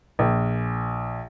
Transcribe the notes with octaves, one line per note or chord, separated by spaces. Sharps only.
A#1